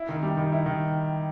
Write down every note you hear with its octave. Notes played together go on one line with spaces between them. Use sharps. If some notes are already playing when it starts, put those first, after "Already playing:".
Already playing: E4
D#3
G3
D#3
E4
D#3